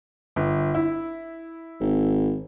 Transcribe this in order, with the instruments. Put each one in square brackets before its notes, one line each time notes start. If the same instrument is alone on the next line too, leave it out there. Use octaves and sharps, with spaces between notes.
[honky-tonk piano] G1
E4
[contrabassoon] G#1